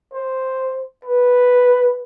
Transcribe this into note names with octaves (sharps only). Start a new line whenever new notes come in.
C5
B4